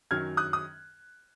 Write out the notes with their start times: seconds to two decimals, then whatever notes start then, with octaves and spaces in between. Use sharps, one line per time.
0.11 F#2 D#3 F#3 C#4 F6 G#6
0.37 D#6 F#6
0.53 D#6